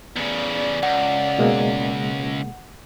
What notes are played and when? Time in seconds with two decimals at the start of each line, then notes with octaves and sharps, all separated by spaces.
0.16 E2 C#3 D5
0.83 C#2 F#5
1.39 B2 G#3 A#3